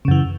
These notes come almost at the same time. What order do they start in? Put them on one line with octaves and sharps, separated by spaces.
C#3 F#2 E3